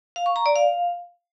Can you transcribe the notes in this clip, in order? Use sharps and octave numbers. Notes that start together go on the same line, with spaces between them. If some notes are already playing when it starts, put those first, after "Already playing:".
F5
C#6
A#5
D5
F5